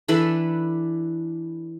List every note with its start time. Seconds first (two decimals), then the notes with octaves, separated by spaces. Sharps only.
0.08 E3 D4 A4 B4